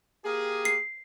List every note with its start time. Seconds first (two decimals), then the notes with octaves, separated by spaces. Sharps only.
0.24 A#3 G4 G#4
0.65 C7